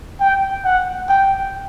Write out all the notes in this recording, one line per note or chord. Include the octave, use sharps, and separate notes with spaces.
G5
F#5
G5